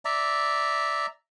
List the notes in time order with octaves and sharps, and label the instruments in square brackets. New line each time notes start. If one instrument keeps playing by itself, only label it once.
[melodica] D5 E5 A#5